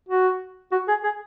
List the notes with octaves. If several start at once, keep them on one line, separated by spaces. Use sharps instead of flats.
F#4
F#4
G#4
G#4